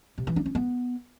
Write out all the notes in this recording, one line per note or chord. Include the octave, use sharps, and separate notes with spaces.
C3
E3
D4
C#4
B3